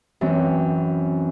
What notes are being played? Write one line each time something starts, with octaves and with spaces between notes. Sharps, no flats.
F#2 E3 C4